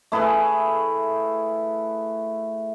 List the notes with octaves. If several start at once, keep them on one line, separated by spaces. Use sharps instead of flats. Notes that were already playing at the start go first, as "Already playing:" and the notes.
A3 E4 G#4 B4